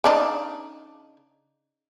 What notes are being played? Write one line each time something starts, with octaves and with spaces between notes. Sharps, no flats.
C#3 D4 D#4